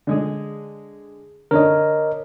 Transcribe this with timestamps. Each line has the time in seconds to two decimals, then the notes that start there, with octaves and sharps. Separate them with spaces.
0.07 D3 G#3 G#4
1.51 D3 D4 A#4 C#5 D#5